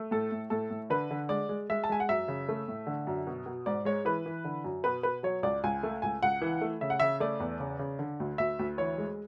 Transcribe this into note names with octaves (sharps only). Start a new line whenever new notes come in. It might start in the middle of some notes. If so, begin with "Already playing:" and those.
Already playing: A3
A2 A4
A2
A2 A4
A2
D3 B4
D3
G#3 D5
G#3
G#3 E5
A5
G#3 G#5
F#5
F#2 E5
C#3
A3
A2
D3
F#2
B2
B2
G#2 D5
G#3 C#5
E3 B4
E3
D3
F#2
B2 B4
B2 B4
F#3 C#5
C#2 D5
C#2 G#5
A3
C#2 G#5
C#2 F#5
E3
A3
C#3 E5
F#5
C#3 E5
A3 D5
E2
C#3
C#3
D3
D2
D2 E5
D2
E3 C#5
G#3